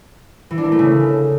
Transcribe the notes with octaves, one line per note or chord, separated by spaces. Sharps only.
E3
D4
A#3
A3
C#3